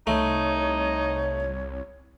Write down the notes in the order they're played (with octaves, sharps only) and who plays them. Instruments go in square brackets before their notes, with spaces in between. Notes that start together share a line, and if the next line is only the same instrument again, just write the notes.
[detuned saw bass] C2 [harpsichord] A3 [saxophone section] D#4 [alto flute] C#5